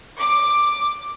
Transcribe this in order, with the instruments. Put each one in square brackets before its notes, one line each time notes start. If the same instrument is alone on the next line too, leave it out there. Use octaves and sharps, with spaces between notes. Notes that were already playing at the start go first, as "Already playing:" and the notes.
[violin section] D6